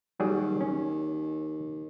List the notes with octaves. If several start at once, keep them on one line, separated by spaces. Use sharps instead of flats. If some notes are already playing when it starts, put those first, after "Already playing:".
D#2 F#3 G3 G#4
C#4